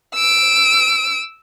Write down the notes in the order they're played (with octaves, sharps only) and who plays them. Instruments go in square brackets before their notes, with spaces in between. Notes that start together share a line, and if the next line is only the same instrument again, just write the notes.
[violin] E6 D7